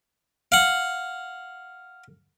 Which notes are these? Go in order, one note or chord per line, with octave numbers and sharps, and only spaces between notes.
F5 F#5